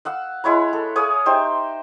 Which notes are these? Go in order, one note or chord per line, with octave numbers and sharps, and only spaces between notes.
F5 F#5 E6
G#3 E4 C#5 B5
A4
G#4 C#5 F5 D#6
D#4 G4 C5 E5